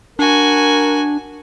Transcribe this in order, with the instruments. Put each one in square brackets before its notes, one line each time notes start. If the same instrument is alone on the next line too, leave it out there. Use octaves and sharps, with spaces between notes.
[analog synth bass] D4 [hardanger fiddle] F#4 G#5 [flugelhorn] A#4